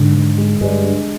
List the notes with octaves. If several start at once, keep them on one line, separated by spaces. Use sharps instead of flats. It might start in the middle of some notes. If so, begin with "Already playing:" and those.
Already playing: G#2 D3
D3
G#3
G2 G#3
D4